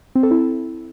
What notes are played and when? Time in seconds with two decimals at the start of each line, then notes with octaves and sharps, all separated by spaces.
0.15 C4
0.23 A4
0.31 E4